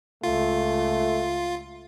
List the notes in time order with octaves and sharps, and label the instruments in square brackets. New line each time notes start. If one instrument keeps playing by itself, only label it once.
[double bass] C#2 [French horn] A3 [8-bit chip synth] F4